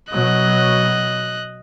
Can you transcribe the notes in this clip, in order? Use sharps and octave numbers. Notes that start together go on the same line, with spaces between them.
B2 F#3 D#5 F#6